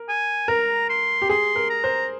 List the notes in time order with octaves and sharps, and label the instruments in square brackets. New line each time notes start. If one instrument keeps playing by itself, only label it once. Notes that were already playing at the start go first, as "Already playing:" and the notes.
Already playing: [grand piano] A#4
[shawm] G#5
[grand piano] A#4 [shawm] A#5
[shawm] C6
[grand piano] G4
[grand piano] G#4 [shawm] C6
[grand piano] A#4
[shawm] A#5
[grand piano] C5